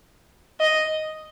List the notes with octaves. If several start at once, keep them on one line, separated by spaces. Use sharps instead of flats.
D#5